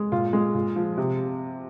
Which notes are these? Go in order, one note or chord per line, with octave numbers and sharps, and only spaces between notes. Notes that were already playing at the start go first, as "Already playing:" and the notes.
Already playing: G#3
A#2 F4
G#3
A#2
F3
C3